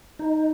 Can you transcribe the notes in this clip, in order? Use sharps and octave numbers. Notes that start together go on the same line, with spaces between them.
D#4